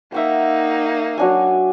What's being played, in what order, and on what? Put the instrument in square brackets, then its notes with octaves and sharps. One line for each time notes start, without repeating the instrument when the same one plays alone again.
[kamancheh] A#3 D#4 [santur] E5 F#5 G5
[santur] F#3 D4 G#5